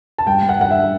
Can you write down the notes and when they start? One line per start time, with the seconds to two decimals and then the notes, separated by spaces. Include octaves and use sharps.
0.18 A5
0.27 G2 G5
0.43 G2
0.49 F#5
0.60 G2 F#5
0.71 E5